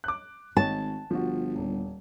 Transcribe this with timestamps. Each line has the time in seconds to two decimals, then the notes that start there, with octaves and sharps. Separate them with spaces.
0.04 D6 F#6
0.57 G#1 C#5 D#5 A5
1.11 G1 F3 F#4
1.56 D#1